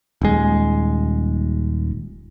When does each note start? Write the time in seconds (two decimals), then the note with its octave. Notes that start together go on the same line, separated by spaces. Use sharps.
0.21 D#1 G#3